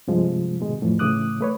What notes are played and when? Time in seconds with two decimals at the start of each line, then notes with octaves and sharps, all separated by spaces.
0.08 G2 C3 F3 G#3
0.60 G#2 B2 D#3 G#3
0.81 F2 A2 E3 F3
0.99 A2 C#3 E3 D6 D#6 F#6
1.41 A3 B4 C#5